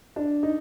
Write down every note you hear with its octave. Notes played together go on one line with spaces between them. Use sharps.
D4
D#4